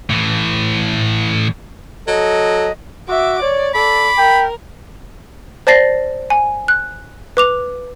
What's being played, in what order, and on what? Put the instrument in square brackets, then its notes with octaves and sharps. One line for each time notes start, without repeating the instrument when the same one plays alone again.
[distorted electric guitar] A2 E3
[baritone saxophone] F#3 [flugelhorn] A4 [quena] D#5
[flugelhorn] F#4 [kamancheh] E5 D6
[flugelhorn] C#5 [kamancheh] D5
[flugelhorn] A4 [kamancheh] D5 D6 [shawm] B5
[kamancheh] A#4 [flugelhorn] G5
[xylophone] C5 D5 A5 A6 A#6 C7
G#5
F#6
B4 D6 F7